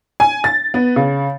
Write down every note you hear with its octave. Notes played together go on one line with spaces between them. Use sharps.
G#5
A6
B3
C#3